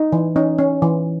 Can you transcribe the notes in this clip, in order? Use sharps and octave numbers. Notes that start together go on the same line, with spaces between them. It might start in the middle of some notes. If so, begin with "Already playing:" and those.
Already playing: D#4
E3
C#4 D#4
C#4
E3